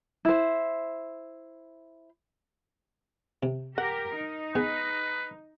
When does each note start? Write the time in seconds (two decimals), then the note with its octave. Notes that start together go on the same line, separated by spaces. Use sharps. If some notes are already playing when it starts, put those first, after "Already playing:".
0.25 E4 C5
3.43 C3
3.78 G4 A#4 F#5
4.16 D#4
4.55 B3 G#4 B4